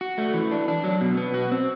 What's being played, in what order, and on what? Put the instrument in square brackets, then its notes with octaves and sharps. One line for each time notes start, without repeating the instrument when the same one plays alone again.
[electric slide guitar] F#4
A3
E3
D4
D4
F#3
B2
B3
F#4
C4